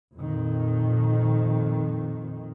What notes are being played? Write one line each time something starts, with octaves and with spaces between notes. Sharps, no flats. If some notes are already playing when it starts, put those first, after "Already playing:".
F2 A#2 D#3